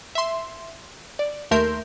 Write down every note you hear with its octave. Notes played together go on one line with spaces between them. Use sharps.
E5 C6
D5
D#2 A3 A#4 E5 C6 G6